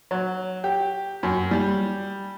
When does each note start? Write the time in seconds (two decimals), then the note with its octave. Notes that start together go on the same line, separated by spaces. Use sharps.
0.11 F#3
0.64 G4
1.23 F#2
1.51 G3